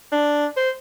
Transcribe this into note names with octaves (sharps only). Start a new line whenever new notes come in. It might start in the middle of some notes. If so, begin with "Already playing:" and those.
D4
C5